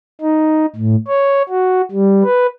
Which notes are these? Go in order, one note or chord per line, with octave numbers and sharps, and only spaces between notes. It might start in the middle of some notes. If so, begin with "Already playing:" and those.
D#4
A2
C#5
F#4
G3
B4